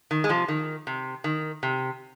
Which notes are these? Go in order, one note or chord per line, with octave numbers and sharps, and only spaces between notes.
D#3
G#3
C3 F3
D#3
C3
D#3
C3